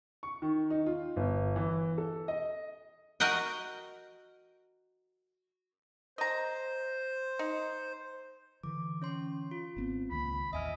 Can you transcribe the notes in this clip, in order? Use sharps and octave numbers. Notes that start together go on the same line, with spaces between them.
C#6
D#3
D#4
F4
G1
E3
A4
D#5
F#4 A#4 D#5 F#5 G5
C5 D#5 A#5
D#4
D3 E3 D6
C#4 C#5 C6
F4
G#1 B3 C4
C#2 D#3 A#3 B5
A1 D#2 D#5 E5 G#5 F6